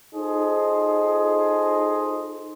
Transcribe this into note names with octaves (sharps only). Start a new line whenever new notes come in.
D#4 F4 G#4 A4 C5 D#5